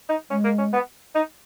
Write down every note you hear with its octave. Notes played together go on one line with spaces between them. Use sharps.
D#4
G#3 C#4
A#3
C#4
B3
D#4